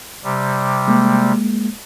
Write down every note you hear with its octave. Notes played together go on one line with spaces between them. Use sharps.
C3 G3
G#3 A#3